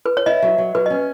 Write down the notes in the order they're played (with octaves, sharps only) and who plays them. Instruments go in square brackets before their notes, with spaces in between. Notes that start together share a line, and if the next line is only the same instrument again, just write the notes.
[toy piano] B4
C#5
[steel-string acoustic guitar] E4 [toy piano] D#5
[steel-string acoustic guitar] F#3
F#3
[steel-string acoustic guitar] F#3 [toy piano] B4
[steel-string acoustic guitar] C#4 [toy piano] D#5